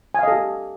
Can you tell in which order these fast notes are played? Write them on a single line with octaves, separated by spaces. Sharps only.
G#5 F5 D#5 A4 G4